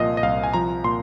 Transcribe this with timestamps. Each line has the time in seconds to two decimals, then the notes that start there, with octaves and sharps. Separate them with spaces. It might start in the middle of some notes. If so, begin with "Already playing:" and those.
Already playing: C2 A#2 F3 D#5 F5
0.17 D#5
0.23 C2 F5
0.44 G#5
0.54 F3 A#5
0.84 A#2 C6